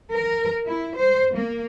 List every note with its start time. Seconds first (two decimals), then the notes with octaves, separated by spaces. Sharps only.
0.12 A#4
0.65 E4
0.96 C5
1.34 A#3